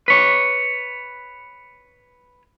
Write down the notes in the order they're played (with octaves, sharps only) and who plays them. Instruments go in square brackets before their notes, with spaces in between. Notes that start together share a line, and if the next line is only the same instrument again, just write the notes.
[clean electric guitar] B4 C#5